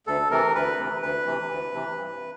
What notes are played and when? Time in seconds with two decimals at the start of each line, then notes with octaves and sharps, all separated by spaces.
0.07 D2 A4
0.31 C3 E3 A#4
0.55 D2 B4
0.78 C3 E3
1.02 D2 B4
1.26 C3 E3
1.50 D2
1.74 C3 E3
1.97 G2